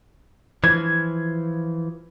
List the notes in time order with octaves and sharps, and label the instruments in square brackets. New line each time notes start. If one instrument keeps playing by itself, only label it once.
[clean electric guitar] E3 F3 [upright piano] G#6